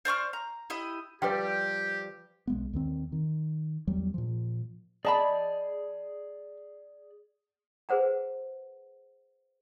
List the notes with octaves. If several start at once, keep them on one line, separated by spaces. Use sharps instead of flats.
C5 D5 C#6 F6
A#5
E4 G4 D#5
F3 G3 G4 B4 D5 G5
B1 G#3 B3
D#2 D#3 C4
D#3
E2 F#3 G3
A#2 F3
G#4 D5 D#5 A5 B5
G#4 B4 C5 F#5 A#5